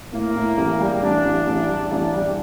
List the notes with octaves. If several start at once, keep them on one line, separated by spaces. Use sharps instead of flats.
A2 A#3
A2
A1
G3
A1 D4
A1
A1 D4
G3
A1 D4
G3